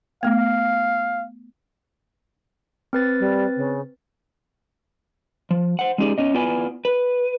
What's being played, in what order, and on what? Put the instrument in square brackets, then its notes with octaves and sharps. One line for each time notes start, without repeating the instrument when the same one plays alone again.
[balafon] A3 B3 [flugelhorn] F5
[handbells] C4 B4 A6
[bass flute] G3
C#3
[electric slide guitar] F3
C5 F#5
G#3 C#4 D#4 G4 G#4 D5
B3 C#4 D#5
B3 E4 F4 B4 D5 G#5
B4